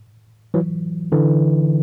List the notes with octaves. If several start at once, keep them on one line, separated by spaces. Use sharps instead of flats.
E3 F#3
D3 E3